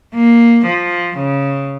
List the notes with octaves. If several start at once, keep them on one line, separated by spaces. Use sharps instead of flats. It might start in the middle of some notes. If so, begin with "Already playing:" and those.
A#3
F3
C#3